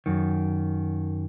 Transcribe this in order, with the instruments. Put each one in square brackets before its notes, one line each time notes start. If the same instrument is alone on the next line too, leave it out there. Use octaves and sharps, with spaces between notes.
[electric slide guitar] F#2 D#3